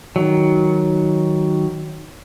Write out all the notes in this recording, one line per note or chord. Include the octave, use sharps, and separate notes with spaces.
D#3 F#3